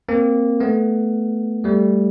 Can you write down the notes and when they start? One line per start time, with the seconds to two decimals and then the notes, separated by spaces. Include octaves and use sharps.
0.08 A#3 C4
0.60 A3 B3
1.64 G3 A3